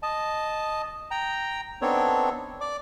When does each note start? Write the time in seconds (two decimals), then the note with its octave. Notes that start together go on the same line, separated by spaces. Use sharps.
0.03 D#5 A5
1.11 G5 A#5
1.82 B3 C4 D4 D#4 A4 C#5
2.61 D5 D6